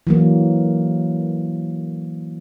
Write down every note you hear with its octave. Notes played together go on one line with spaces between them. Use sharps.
E3 F#3 A#3